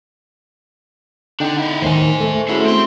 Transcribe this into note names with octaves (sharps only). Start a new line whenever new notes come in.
D3 D4 D#4 F#5 G5
E4 D#5
D#2 A2 D#3 C5 G#5
A3
C#4 E4 F#4 G#4 C5
C4 C6